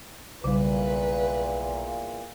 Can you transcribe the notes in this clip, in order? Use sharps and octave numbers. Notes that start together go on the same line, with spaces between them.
B1 E2 A#2 C#3 G3 B4